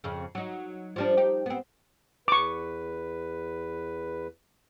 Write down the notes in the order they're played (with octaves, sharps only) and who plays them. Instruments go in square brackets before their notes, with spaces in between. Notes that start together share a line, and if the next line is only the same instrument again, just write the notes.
[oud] F2 C#3
F#3 D#4
F3 G3 D4
D#4 G4
B3 C4
[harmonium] E2 B4 [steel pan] C#6 D6